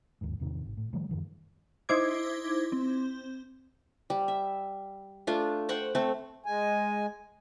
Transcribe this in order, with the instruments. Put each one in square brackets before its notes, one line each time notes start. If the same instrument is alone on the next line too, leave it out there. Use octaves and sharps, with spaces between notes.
[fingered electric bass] G1 D#2 G#2
E2 A2 C3 D#3
G#1
A2
D#3 F3 G3 A3
F#2 A#2 D#3 F3
[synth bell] D#4 E4 C5 D6 G#6
C4
[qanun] G3
E5
A3 D4 F4
C5 F#5 G5 C#6
A3 C4
[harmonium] G#3 G#5